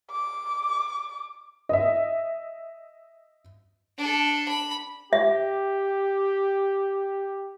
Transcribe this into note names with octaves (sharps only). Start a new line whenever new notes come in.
D6
D#5 E5
D4 A4
B5
G4 E5